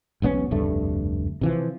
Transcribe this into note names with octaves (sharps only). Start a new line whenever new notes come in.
E1 B1 B3 C#4
F1 D2 G2 A3
C3 E3 F3